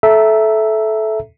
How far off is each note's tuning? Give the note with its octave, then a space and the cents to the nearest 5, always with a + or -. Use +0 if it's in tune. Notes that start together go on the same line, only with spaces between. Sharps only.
A4 -20 E5 +0 A#5 +0